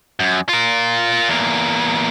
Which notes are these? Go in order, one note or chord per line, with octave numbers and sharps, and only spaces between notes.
F#2
F4 A#4
E2 A#3